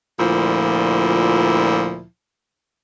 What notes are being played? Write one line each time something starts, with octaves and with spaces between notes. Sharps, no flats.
D2 A#2 F3 E4